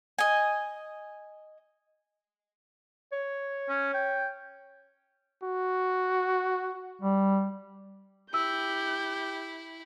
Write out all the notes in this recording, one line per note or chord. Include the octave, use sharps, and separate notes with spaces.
D#5 G#5
C#5
C#4
G5
F#4
G3
E4 G4 E6 G6